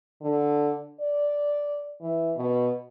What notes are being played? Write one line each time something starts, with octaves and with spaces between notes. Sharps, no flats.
D3
D5
E3
B2